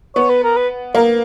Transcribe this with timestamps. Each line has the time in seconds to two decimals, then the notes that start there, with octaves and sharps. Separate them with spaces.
0.15 B3 C#5
0.30 B4
0.43 A#4
0.57 B4
0.95 A#3 A#4